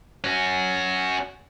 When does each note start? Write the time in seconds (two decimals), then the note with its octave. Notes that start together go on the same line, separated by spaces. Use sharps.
0.24 C#4 F#4